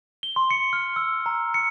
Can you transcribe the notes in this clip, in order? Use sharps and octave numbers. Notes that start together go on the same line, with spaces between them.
G7
C6
C#7
F6
E6
A#5
C#7